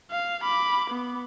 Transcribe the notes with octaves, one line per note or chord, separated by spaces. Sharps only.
F5
B5 D6
B3